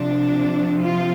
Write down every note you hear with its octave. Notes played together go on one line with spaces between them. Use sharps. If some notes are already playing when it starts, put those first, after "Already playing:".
Already playing: C3 F3 D4
F4